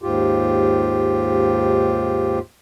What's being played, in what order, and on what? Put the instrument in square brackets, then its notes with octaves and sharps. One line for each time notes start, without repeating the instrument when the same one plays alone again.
[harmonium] D#2 G#2 F4 G4